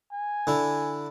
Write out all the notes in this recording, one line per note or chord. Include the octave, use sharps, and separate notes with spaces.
G#5
D3 E4